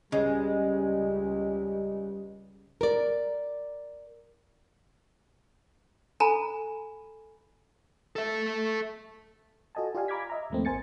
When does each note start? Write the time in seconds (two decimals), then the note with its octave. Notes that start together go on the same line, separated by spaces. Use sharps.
0.12 C#2 C#3 G3 G#3
2.81 A#4 D5
6.20 A4 G#5 A#5 B5
8.16 A4 E5
9.75 F4 F#4 A4 D#5 G#5 A5
9.95 F4 G4 D5 F5 G#5
10.08 A#5 B5 D6 F6 G#6 B6
10.30 D#5 E5 A#5
10.50 D#2 G#2 F3 A3 A#3 C4
10.65 A1 A#4 C5 G#5 A6 C#7